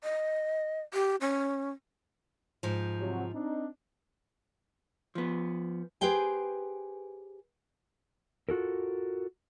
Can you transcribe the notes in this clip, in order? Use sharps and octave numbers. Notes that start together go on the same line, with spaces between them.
D#5
G4
C#4
G#2 F3
C3 F#3
C4 D4 D#4
F3 B3
G4 G#4 B4 C5 G5 G#5
F4 F#4 A4 A#4